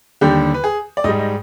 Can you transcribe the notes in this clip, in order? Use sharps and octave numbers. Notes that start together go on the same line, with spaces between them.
D#2 D3 G3 G4
B4
G#4
D5
G#2 G3 D#5
D#5